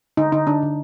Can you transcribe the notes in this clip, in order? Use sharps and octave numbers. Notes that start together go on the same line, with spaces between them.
D3 D#4
D3 D#4
D3 D4
D3